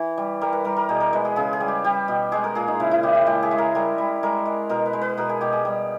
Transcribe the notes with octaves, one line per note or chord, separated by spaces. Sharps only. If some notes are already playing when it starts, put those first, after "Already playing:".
Already playing: E3
G3
G3 A#4
B4
G3 A#4
A#4
B2 G#4
A#4
G#3 B4
G#4
C#3 G#4
G#4
G3
G4
G3 G4
B2
G#3 G#4
A#4
A#2 G#4
D#4
C#3 E4
E4
C#3 G4
G4
G#3 G4
G#4
G#3
A#4
G3 A#4
G3
G#3 A#4
G#3
B2 A#4
B4
G#3
B4
B2 A#4
G#4
B2 G4
G#4
G3